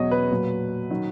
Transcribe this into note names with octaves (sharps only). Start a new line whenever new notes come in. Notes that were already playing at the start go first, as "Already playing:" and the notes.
Already playing: E2 B2 F#3 C#5 D#5
B4
A#2 F#3
D#3 F#3